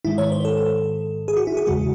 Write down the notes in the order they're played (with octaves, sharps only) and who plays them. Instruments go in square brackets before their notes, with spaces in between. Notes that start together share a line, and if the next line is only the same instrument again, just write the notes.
[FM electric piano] G#2 D#3 G#3 E4
C#5
C5
A4
G#4
F#4
E4
G#4
E2 C#3 G#3 F#4